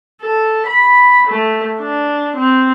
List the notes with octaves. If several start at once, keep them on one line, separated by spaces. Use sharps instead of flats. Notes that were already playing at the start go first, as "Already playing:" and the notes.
A4
B5
A3
D4
C4